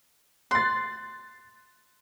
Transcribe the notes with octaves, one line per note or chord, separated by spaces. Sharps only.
C6 F#6 A6